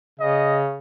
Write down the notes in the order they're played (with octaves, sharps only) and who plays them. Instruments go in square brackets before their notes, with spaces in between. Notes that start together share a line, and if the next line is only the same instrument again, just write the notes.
[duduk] C#3 [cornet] D#5